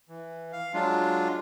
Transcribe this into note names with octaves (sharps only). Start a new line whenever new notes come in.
E3
F5
F#3 G#3 D4 F4